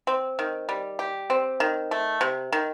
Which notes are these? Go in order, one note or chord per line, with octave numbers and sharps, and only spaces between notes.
C4
D#3
G3
G4
C4
D#3
A3
C3
D#3